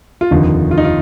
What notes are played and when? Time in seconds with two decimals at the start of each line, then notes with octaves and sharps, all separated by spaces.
0.21 F4
0.31 F1 D#2 D3 F3 D#4
0.71 F4
0.78 D#4
0.84 F4